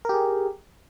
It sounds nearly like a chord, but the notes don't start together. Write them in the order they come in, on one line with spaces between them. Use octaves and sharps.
A#4 G4 G#4